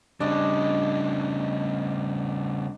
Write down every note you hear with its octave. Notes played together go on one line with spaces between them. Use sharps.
C#3 G3 D4 D#5